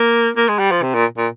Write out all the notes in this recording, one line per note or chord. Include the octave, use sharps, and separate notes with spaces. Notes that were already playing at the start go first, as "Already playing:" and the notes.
Already playing: A#3
A#3
G#3
G3
F3
C3
A#2
A#2